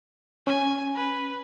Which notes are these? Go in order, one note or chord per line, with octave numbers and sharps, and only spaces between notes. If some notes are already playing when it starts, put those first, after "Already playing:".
C#4 G#5
B4